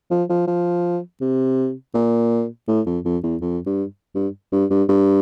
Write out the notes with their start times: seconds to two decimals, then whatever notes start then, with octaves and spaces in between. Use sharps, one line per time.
0.11 F3
0.30 F3
0.48 F3
1.21 C3
1.94 A#2
2.68 A2
2.86 F2
3.05 F2
3.23 E2
3.41 F2
3.66 G2
4.15 G2
4.52 G2
4.70 G2
4.89 G2